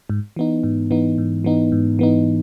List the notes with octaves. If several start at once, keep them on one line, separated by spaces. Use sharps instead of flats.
G#2
E3 B3 D#4
G#2
E3 B3 D#4
G#2
E3 B3 D#4
G#2
E3 B3 D#4